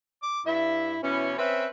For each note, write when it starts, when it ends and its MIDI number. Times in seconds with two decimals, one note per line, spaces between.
0.23 0.41 86
0.46 0.96 43
0.46 1.02 64
0.46 0.96 76
1.03 1.37 47
1.03 1.37 52
1.03 1.37 61
1.03 1.28 64
1.39 1.67 60
1.39 1.67 61
1.39 1.67 71
1.39 1.67 76